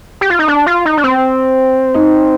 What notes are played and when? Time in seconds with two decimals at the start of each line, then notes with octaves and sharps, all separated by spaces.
0.21 G4
0.30 F4
0.39 D#4
0.48 D4
0.66 F4
0.85 D#4
0.97 D4
1.04 C4
1.94 D#4